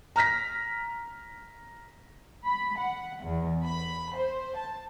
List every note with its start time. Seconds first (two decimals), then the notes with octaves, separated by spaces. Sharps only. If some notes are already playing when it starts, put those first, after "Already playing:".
0.16 A#5 F6 A#6 B6
2.44 B5
2.78 F#5
3.23 E2
3.64 B5
4.16 C5
4.56 A5